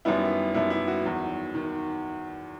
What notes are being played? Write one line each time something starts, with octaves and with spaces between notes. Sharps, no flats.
F#2 D#3 G3 B3 E4
F#2 D#3 G3 B3 E4
E4
F#4
E2 D#3 F#3
D#3